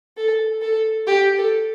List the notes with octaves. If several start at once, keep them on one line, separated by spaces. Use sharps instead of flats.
A4
A4
G4
A4